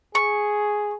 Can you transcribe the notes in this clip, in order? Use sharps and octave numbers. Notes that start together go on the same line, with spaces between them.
G#4 C#6